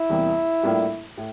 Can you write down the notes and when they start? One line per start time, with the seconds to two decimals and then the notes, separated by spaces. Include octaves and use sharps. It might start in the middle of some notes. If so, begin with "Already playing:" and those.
Already playing: E4
0.09 E2 C3 E3 G3 A#3
0.63 A2 G3 A#3 D4 F4
1.17 A2